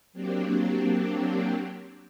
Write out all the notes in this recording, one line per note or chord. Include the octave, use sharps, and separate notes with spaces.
F#3 A#3 C4 D4 G4